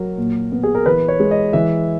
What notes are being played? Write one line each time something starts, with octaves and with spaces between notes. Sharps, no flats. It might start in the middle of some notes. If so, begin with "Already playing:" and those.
Already playing: F#3 A#4
A#2
B3
G#4
A#4
E3 B4
C#5
G#3
D#5
E3 E5